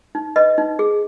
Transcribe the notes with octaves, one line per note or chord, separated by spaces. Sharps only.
D#4
B4 D#5
D#4
G#4